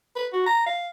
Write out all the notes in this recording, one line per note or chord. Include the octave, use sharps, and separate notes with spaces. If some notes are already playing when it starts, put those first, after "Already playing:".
B4
F#4
A#5
F5